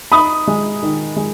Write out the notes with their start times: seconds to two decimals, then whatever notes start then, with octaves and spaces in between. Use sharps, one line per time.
0.12 D#4 B5 D#6
0.47 G#3
0.83 D#3
1.16 G#3